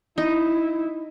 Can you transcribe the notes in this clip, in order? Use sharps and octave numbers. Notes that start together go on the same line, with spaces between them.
D#4 E4